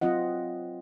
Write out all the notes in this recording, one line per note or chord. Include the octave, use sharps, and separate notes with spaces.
F#3 C4 F4 D#5 F#5